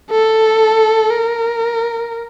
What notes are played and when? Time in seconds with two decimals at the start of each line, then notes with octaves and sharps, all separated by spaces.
0.11 A4
1.11 A#4